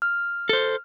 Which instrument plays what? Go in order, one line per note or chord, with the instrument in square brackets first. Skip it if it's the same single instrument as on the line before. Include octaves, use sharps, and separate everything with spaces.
[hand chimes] F6
[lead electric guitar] A4 C5